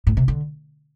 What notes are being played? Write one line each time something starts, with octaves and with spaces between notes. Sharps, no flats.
A2
C3
D3